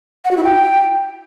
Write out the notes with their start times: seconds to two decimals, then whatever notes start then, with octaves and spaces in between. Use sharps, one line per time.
0.25 F#5
0.31 F#4
0.37 E4
0.44 G5